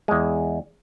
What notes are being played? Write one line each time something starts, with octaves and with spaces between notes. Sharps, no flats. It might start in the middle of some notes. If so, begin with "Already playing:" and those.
E2 G#3